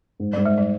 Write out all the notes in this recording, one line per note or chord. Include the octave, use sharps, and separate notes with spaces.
G#2
G#2 G3
G#3
G3